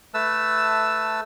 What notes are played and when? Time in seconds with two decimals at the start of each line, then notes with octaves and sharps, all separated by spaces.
0.14 A3 B4 A5 E6